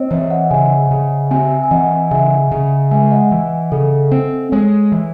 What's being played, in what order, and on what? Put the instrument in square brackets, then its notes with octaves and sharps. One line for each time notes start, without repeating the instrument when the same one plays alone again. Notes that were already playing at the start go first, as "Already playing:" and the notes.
Already playing: [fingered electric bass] C4 [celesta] C5 C#5 D#5
[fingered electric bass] E3 [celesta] C#5 E5
[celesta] D#5 F#5
[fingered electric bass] C#3 [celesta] E5 G#5
[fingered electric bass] C#3
[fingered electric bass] C4 [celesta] E5 G#5
[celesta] G#5
[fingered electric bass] E3 [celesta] D#5 F#5
[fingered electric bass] C#3 [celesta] E5 G#5
[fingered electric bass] C#3
[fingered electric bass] G#3 [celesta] E5 G#5
[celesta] D#5 F#5
[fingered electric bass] E3
[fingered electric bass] C#3 [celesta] A4
[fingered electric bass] C4 [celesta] C5
[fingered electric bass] G#3 [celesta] C#5
[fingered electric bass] E3